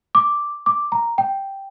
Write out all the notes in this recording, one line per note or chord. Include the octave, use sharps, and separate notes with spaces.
D6
D6
A#5
G5